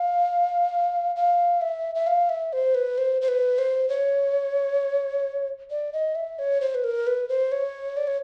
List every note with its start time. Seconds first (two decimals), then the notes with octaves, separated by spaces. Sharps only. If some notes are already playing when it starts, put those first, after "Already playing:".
Already playing: F5
1.16 F5
1.62 E5
1.95 E5
2.07 F5
2.29 E5
2.53 C5
2.75 B4
2.98 C5
3.22 C5
3.28 B4
3.58 C5
3.89 C#5
5.71 D5
5.93 D#5
6.15 E5
6.39 C#5
6.61 C5
6.75 B4
6.84 A#4
7.07 B4
7.29 C5
7.52 C#5
7.97 D5
8.07 C#5